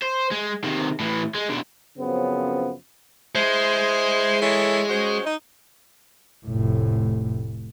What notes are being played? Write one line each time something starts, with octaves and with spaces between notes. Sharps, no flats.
C5
G#3
C3 D#3
A2 E3
G#3
B1 D3
F#2 C#3 F3 B3 C4
G#3 E4 C5
E3 A4 C#5
C#4 F#4 C5
D#4
F1 A2